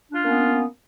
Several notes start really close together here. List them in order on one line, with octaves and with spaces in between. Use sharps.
D4 F4 C#4 A#3 B3